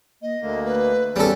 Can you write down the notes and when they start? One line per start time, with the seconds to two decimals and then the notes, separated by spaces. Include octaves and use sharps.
0.22 A#3 D#5
0.42 D2 D3 A3 A#3
0.65 B4
1.16 D#2 F#3 G3 B3 C#4 G#4 A4